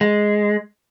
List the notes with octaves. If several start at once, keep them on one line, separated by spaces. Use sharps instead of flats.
G#3